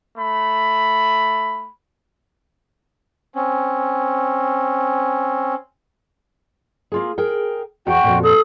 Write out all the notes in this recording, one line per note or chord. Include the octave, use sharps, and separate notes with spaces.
A3 B5
C4 C#4
A#3 F4 G#4
G#4 A#4 G5
E2 F#4 G5
F2 A#2
A4 D#6